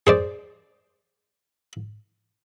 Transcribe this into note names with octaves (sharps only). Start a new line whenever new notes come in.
G#4 C5 D5